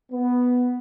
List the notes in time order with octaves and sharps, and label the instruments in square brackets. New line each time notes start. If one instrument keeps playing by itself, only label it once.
[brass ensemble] B3